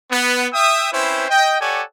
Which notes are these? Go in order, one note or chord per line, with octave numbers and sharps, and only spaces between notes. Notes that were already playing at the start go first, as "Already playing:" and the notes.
B3
E5 G5 D#6
C4 C#4 E4 B4 C5
D#5 G5
G4 A4 C#5 D5 F#5 G#5